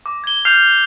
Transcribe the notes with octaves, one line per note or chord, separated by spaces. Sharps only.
D6
G#6 G7
F6 G6 C7 F7